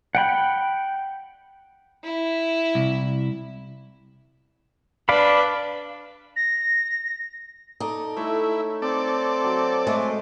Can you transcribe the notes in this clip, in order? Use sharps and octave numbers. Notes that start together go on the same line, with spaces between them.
F#5 G5 B5
E4
C2
D4 B4 D5 F5 B5
A#6
D#4 A4 D5 A5
A3 E4 C#5
C4 A4 D5
F#3
G#3 A3